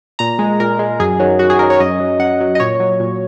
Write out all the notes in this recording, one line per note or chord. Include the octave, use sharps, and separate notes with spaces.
A#2 A#5
G#3
A#2 A#4
G#3
F#2 G#4
D#3 F#3
F#2 F#4
G#4
D#3 F#3 A#4
C#5
F#2 D#5
F#3
F#2 F#5
F#3
D#5
A#2 C#5
F#3
A#2